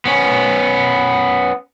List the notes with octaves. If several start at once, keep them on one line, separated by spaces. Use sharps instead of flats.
B3 C#4